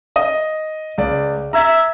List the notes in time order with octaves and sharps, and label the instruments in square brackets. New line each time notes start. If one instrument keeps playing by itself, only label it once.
[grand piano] D#5 D#6
C#2 D5
[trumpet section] E5 [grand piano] A#5 E6 G#6